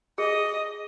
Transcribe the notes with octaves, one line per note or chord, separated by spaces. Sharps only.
G#4 D#5